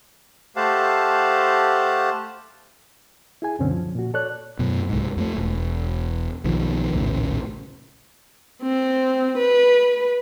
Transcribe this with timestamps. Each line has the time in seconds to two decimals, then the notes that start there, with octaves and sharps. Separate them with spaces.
0.56 A3 G4 C5 F5 F#5 A5
3.42 E4 G#4 G#5
3.59 C#2 F#2 B2 D3 C4 C#4
3.71 F3
3.95 A#2 F#4
4.14 A4 C#5 D5 F#6
4.59 F#2 B2
4.89 C2 G#2
5.17 F2 G#3 A3
5.36 E1
6.44 B1 B2 D#3 F3
6.93 A#1 D#2 A2 C#3
8.63 C4
9.38 B4